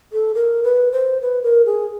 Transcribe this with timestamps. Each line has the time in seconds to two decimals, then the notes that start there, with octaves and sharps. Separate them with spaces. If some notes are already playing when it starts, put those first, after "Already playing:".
0.13 A4
0.35 A#4
0.63 B4
0.92 C5
1.22 B4
1.43 A#4
1.66 G#4